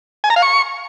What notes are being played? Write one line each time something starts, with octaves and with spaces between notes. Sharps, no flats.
G#5
A#5
F5
C#6